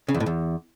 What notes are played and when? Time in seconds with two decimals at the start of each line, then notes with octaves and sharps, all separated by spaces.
0.08 C#3
0.14 E2
0.20 A2
0.26 E2